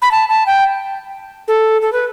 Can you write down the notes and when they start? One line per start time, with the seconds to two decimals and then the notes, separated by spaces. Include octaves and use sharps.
0.02 B5
0.11 A5
0.29 A5
0.46 G5
1.48 A4
1.82 A4
1.93 B4